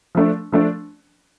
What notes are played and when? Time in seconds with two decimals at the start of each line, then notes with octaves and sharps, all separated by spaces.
0.15 F3 A3 D4
0.52 F3 A3 D4